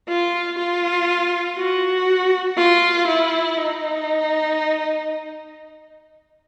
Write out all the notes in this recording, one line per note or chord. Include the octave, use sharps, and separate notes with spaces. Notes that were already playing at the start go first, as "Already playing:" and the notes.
F4
F4
F#4
F4
E4
D#4